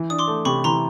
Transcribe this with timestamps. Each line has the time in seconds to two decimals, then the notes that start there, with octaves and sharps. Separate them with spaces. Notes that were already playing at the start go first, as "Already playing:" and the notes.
Already playing: E3
0.10 D4 D#6
0.19 C6 D6
0.27 A3
0.45 C3 B5 C#6
0.64 E3 A#5 C6